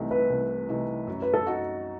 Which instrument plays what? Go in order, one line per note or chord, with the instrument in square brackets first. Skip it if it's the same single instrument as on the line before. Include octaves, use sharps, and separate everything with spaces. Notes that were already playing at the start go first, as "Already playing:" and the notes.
Already playing: [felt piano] C2 C3 E3 A3 D#4
[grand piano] B4
[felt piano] C2
C3 E3 A3 D#4
F#2
[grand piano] B4
A4
[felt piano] D#4 F#4